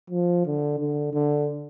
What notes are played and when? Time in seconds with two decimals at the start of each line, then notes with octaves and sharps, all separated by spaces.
0.10 F3
0.46 D3
0.79 D3
1.13 D3